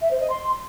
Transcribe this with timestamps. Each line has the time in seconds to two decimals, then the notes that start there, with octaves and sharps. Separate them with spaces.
0.01 E5
0.10 C5
0.20 D#5
0.29 C6